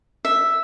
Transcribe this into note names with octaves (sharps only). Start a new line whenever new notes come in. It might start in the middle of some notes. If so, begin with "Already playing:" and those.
E5